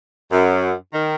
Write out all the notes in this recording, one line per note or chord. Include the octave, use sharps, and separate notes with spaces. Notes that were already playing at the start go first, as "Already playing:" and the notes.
F#2
D#3